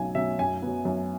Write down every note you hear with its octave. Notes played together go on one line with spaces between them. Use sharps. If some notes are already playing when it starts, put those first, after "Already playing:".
Already playing: B1 B2 F#3 C#4 G#5
B2 F#3 C#4 E5
F#2 G#5
F#3 B3
F#2